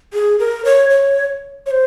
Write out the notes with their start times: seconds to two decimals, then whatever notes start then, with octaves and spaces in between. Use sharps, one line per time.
0.13 G#4
0.39 A#4
0.65 C#5
0.90 C#5
1.66 C#5
1.71 C5